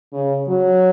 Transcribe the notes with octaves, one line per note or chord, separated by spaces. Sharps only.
C#3
F#3